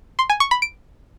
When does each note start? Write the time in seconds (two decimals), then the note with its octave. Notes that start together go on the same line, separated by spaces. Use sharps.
0.19 C6
0.30 G#5
0.40 C#6
0.51 B5
0.62 D7